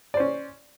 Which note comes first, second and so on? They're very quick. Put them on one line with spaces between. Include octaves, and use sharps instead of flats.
D5 C5 C#4